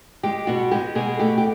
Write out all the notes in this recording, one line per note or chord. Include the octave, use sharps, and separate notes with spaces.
G#3 G4
B2 F#4
G#3 G4
B2 G#4
A3 G4
G4